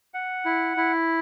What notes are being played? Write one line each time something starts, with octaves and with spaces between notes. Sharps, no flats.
F#5
E4
E4